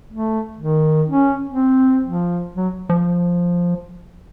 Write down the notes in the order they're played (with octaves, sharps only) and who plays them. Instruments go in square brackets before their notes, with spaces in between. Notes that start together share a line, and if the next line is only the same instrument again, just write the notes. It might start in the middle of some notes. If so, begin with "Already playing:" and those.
[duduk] A3
D#3
C#4
C4
F3
F#3
[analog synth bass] F3